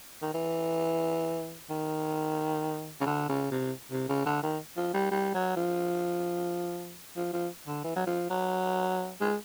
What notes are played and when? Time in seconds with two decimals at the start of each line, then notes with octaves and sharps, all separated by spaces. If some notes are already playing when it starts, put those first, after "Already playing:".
0.22 D#3
0.34 E3
1.70 D#3
3.01 C#3
3.06 D3
3.29 C#3
3.51 C3
3.92 C3
4.09 C#3
4.26 D3
4.43 D#3
4.77 F3
4.94 G3
5.11 G3
5.34 F#3
5.57 F3
7.16 F3
7.33 F3
7.67 D3
7.84 E3
7.96 F#3
8.07 F3
8.30 F#3
9.21 G#3